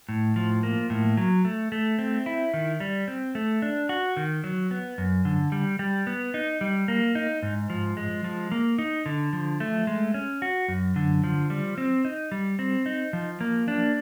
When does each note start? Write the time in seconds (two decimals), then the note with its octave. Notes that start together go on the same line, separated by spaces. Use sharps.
0.09 A2
0.36 F3
0.63 A#3
0.90 A2
1.17 F#3
1.45 A3
1.72 A3
1.99 C4
2.26 E4
2.54 D#3
2.80 G3
3.08 C4
3.35 A3
3.62 D4
3.89 F#4
4.17 D#3
4.44 F#3
4.71 B3
4.98 F#2
5.25 D3
5.52 G3
5.79 G3
6.07 B3
6.34 D#4
6.61 G3
6.88 A#3
7.15 D#4
7.43 G#2
7.70 F3
7.97 G#3
8.24 F3
8.51 A#3
8.79 D#4
9.06 D3
9.33 F3
9.60 A3
9.87 G#3
10.14 C#4
10.42 F#4
10.68 F#2
10.96 D3
11.24 F3
11.50 G3
11.78 C4
12.05 D#4
12.32 G3
12.59 C4
12.86 D#4
13.13 F3
13.41 A#3
13.68 D4